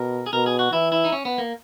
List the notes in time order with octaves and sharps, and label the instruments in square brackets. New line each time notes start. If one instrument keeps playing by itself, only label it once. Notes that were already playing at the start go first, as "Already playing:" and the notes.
Already playing: [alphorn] B2 [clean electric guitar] A#4
[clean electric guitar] G#4
[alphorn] B2 [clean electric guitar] A#4
[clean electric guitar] G#4
F#4
[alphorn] E3 [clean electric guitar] E4
[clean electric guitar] E4
D#4
C#4
B3
A#3